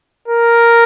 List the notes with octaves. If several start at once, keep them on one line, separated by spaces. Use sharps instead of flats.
A#4